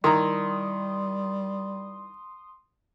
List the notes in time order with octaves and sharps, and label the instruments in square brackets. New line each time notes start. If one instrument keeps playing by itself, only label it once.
[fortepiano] D#3 [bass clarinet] G3 [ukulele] E4 A#5 [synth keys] C6 D#6